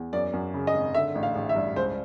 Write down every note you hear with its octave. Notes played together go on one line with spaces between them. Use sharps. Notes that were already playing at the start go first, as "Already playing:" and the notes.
Already playing: E2
F#2 D5
F#2
C#3
D#5
G#1
D3 E5
A1
F5
A1
E5
G2
C#2 C5